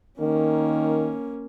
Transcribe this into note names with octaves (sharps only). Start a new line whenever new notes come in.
D#3 A#3 C#4